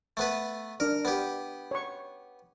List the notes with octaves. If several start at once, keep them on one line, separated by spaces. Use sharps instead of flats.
A3 B3 B4
D4 A#4 D5
B3 G4
C#5 C#6